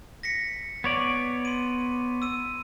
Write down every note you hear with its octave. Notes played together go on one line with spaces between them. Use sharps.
A#6 B6 C#7
B3 C#5 D5
C6 D#7
E6 D#7